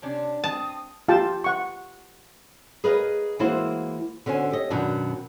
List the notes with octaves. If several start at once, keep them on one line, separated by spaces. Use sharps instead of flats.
C3 C#4 D4 A5
C4 A5 D#6
F4 G4 G5 A5
F#5 C#6
G#4 A#4 B4 D#5 F5
E3 G#3 A#3 E4 F#4 C5
D3 C#4 F#4 C5 G#5
G4 C#5 D#5
F#2 B2 D#3 F#3 C#4 D4